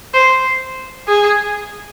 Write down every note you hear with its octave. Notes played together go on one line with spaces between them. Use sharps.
C5
G#4